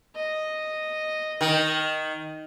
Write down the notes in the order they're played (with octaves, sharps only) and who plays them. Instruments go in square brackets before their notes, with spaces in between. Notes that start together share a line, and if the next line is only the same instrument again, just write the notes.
[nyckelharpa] D#5
[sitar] D#3